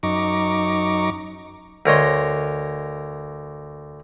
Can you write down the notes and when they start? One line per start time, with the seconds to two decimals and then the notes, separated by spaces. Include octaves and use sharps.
0.03 F#2 D#4 A#5 C#6 D6
1.86 D2 A#4 C#5 D#5 C6